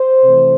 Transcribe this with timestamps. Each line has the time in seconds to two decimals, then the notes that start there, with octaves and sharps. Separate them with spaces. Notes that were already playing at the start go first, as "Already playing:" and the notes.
Already playing: C5
0.24 C3 E3 A3